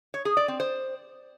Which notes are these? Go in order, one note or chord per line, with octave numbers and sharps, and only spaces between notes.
C#5
G#4
D5
C4
C5